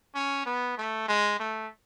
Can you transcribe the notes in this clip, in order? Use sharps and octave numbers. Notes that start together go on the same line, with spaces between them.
C#4
B3
A3
G#3
A3